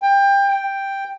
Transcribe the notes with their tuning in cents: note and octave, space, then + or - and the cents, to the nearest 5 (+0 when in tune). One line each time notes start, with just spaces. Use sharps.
G5 +25
G5 +5